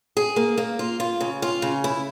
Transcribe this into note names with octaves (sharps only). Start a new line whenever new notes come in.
G#4
A#3
A#3
F4
F4
C#3
F4
C#3
E4